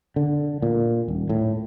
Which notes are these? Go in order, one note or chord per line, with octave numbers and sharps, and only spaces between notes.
D3
A#2
D#1
A2